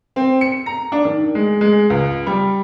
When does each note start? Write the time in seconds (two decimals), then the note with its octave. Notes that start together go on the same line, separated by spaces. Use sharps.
0.16 C4
0.41 C#7
0.66 A#5
0.92 D4
1.05 D#3
1.35 G#3
1.61 G#3
1.90 C#2
2.27 G3